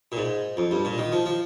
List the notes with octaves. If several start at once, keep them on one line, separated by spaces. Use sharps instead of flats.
A#2
G#2
F2
G2
A#2
D#3
F3
F3